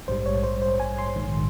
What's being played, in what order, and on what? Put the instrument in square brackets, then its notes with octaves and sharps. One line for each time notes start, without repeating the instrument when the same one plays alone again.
[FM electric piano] A#1 G#2 G3 C5
C#5
C5
C5
G#5
C6
A#1 G#2 D#3